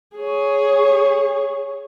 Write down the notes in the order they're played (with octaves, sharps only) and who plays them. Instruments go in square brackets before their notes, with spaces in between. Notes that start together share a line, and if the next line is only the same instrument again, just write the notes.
[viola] G#4 C#5